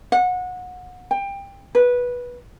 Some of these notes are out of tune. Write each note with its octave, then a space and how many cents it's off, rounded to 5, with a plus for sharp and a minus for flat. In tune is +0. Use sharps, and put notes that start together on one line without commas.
F#5 -25
G5 +20
B4 -15